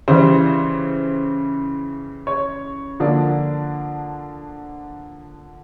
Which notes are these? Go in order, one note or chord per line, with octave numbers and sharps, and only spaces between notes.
C#3 E3 G3 C5
C#5
D3 F3 A#3 D4